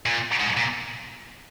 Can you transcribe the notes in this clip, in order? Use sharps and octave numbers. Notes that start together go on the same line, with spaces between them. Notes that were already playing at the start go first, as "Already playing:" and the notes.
A#2
G#2
A#2